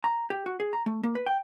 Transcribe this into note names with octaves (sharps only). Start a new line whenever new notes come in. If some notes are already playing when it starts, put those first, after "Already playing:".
A#5
G4
F#4
G#4
A#5
A3
A#3
B4
G5